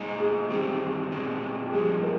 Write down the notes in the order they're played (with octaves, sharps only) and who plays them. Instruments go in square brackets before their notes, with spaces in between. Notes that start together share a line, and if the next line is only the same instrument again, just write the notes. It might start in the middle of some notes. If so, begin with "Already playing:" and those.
Already playing: [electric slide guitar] A#2 G#3 D#4
[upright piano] G#4
[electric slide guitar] G2 D#3 G3 C4 [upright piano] G4
[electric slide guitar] A#2 G#3 C4
[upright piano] G4
[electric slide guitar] G2 F3 A#3 [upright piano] G#4
[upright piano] A#4